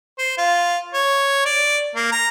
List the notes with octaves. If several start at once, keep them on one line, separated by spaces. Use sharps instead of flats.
C5
F4
C#5
D5
A#3
A#5